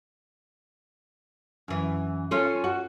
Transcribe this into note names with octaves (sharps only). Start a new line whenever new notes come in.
F#2 E3
C#4 F4 A4
F#4